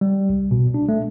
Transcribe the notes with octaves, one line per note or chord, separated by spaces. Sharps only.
G3
C2
B2
D4
A3